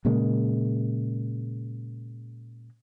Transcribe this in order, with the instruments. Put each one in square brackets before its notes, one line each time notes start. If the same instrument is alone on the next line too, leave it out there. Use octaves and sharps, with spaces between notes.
[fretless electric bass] A#2 C#3 G#3 A#3